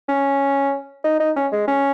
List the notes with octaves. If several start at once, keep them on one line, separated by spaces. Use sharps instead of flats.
C#4
D#4
D#4
C#4
G#3
C#4